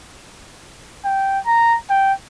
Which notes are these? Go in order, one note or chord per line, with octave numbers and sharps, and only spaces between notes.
G5
A#5
G5